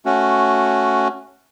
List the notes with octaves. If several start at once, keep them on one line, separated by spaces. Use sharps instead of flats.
A3 C#4 F#4